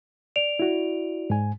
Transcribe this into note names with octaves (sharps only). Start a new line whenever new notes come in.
D5 D7 F7
E4 F#4
G#2 G#5